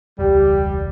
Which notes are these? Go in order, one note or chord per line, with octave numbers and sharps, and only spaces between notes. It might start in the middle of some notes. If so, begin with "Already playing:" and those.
E1 C#2 G3 G4